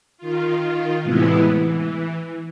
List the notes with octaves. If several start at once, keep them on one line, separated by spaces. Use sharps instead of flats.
D#3 F4
A2 C3 E3 G#3 B3 E4
E3